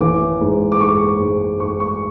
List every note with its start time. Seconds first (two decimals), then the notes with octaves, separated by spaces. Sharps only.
0.01 A1 D6
0.41 G#2
0.72 D6
0.80 G#2 C#6
1.20 G#2
1.60 G#2 C#6
1.80 C#6